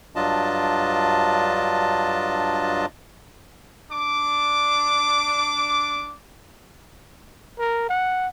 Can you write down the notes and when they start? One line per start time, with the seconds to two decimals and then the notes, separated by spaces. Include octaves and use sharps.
0.16 G2 F#3 D4 F4 D#5 A5
3.90 D4 D6
7.59 A#4
7.89 F#5